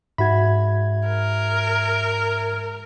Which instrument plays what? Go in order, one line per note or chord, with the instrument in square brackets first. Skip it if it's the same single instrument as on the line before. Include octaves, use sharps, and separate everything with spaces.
[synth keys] G#2 G#6 [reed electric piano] F#4 B5 [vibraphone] E5
[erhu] A#4